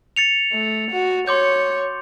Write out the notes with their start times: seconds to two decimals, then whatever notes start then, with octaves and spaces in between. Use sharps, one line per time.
0.16 A6 C#7 F7
0.52 A3
0.91 F#4
1.28 C#5 C6 D6 G6